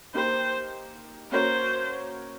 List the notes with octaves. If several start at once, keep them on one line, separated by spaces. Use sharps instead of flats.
A#3 D#4 G4 A#4 C5
A#3 C#4 F#4 A#4 C5 C#5